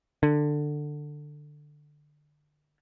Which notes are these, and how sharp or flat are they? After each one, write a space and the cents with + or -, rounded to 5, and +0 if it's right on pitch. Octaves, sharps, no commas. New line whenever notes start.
D3 +15